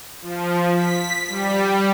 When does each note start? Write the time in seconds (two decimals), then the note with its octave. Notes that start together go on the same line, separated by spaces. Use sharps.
0.22 F3
0.74 B6
1.29 G3